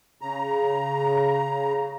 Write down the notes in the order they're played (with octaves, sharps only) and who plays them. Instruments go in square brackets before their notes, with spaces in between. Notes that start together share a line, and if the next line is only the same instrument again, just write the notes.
[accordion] C#3 A#5